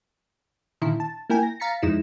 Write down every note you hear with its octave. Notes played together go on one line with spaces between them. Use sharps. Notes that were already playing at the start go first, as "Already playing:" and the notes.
A#2 D3 D#3 E4
A5
A#3 E4 A#4 G5 G#5
A#6
F5 A#5 A6 B6 C#7
F2 G#3 D#4 E4 E7